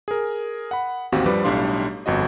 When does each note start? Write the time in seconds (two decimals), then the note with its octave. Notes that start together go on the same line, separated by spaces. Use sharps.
0.08 G#4 A#4
0.71 F#5 B5
1.12 A1 D#2 C4 F#4 G4 F5
1.26 G2 F3 G3 B4 D6
1.44 B1 A2 G3 D4 F5 C6
2.06 G1 F2 F#4 D#5